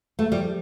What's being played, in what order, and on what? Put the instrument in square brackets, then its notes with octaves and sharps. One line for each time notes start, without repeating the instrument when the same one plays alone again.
[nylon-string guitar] A3
[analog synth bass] F3 [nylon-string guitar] G3